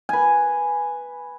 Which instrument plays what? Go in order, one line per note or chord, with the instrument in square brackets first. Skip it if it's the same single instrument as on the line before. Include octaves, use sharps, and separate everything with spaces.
[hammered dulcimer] B4 G#5